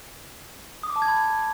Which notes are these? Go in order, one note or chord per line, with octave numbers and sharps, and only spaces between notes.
D#6
D6
A5
G#6
B5